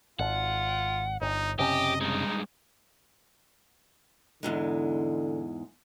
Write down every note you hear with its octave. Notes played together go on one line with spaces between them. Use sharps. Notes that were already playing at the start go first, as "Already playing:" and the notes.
G#1 F4 F#5
G1 D#4
F#1 C3 C#4 G4 D#5
G2 G#3 D#4
E2 G#2 D3 G#3